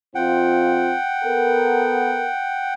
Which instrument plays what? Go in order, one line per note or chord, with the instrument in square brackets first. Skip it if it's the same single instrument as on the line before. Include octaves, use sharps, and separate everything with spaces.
[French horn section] F2 C4 F4 [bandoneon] F#5 G5
[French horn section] B3 A4 A#4